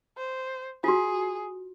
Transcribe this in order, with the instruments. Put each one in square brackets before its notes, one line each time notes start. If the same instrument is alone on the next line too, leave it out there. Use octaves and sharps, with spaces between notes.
[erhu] C5
[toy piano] F4 F#4 [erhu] G#4